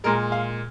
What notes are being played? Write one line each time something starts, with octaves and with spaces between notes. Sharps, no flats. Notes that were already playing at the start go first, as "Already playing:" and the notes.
A#2 G#3 A#4
F5